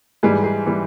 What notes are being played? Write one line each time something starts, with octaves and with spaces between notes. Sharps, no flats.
G#2 E3 G3 G#4
G#4
E3 G3